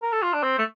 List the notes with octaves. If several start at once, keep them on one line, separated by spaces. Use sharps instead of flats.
A#4
A4
F4
D4
C4
A3